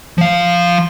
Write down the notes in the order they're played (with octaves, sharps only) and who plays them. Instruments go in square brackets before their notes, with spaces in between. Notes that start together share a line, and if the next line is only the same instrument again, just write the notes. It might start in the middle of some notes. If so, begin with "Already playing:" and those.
[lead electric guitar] F3 F5